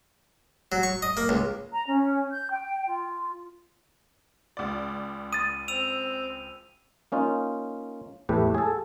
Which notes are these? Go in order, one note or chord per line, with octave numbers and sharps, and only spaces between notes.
F#3
C#6
D#5
A#3
C#2
A#5
C#4
G6
G5
F4
C#2 D5
D#6 A6 D#7
C4 E6 D#7 F7
A#3 C#4 D#4 F4
E2 A2 A3 G4 B4
G#4 A4